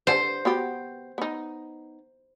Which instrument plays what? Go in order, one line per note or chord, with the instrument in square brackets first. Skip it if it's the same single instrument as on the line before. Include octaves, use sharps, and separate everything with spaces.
[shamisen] D3 G5 A5 [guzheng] C5
[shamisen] B3 F#4 G4
B3 D#4